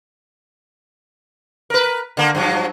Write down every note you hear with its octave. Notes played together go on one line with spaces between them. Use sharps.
A#4 B4
D3 A#3
G2 F3 F#3